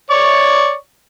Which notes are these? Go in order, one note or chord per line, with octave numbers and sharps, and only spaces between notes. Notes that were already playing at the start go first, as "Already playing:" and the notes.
C#5 D5 C#6